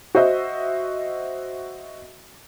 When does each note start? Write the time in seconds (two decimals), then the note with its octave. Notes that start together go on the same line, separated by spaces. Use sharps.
0.15 F#4 C5 D#5 E5